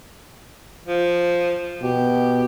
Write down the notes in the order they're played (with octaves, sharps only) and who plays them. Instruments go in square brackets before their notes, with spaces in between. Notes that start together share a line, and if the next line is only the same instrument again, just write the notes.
[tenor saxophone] F3
[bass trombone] B2 [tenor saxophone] G4